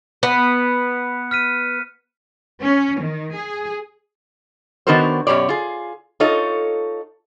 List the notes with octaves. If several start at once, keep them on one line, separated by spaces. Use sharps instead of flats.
B3 F#6 C#7
F6 B6 D#7
C#4
D#3
G#4
D#3 B3 D4 F#4 A#4 C5
F#2 B2 F3 G4 C#5 D5
F4 G#4
D#4 F4 A4 C#5 D#5